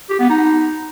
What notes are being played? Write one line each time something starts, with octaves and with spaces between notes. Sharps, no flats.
G4
B3
D#4